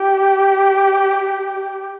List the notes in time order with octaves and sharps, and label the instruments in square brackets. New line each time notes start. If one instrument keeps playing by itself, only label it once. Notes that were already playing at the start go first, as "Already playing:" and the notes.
Already playing: [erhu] G4